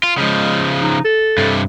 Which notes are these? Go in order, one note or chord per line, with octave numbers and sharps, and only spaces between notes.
F4
C#3 F3 G#3
D#4
A4
G2 C3